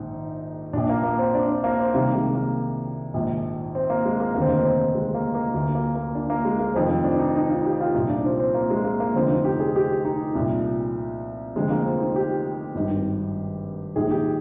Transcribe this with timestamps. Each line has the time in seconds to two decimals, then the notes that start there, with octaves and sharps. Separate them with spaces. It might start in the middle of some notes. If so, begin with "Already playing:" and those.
Already playing: A#1 G#2 D#3 D#4
0.73 A#1 A#2 D4
0.89 A#3
1.03 A#3
1.19 C4
1.35 D4
1.50 C4
1.64 A#3
1.80 C4
1.94 C2 C3 D#3 A#3
2.15 G#3
2.35 A#3
3.14 A#1 G#2 D#3
3.75 C4
3.90 A#3
4.05 G#3
4.20 A#3
4.34 F1 D#2 D3 A#3
4.42 C4
4.49 A#3
4.64 C4
4.95 G#3
5.14 A#3
5.34 A#3
5.54 D2 D3 A#3
5.75 A#3
5.95 A#3
6.15 D4
6.30 A#3
6.45 G#3
6.59 A#3
6.74 F1 F2 D#3 C4
6.89 C4
7.04 D4
7.19 D#4
7.35 D#4
7.50 F4
7.65 G4
7.81 F4
7.94 C2 A#2 D#4
8.10 D4
8.25 C4
8.40 C4
8.54 A#3
8.70 G#3
8.85 A#3
9.00 A#3
9.14 F1 F2 D3 C4
9.30 D#4
9.45 G4
9.60 G#4
9.76 G4
10.05 D#4
10.35 C2 A#2
11.56 F1 F2 D3 G#3
11.70 A#3
11.85 C4
12.00 D#4
12.16 G4
12.75 G#1 G2 D#3
13.96 A#1 G#2 D#3 G#4
14.11 G4